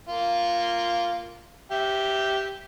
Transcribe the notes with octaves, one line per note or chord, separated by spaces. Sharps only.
A#3 F4
G4 E5